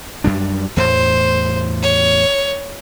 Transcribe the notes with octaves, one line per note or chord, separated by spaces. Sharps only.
F#2 G3 D4
E2 A2 C5
C#5